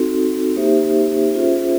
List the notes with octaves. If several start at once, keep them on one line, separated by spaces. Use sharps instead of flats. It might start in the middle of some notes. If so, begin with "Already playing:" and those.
Already playing: C4 D#4 F#4 A4
A#3 D#4 G4 C5 E5
C#4 F4 G#4 C5 E5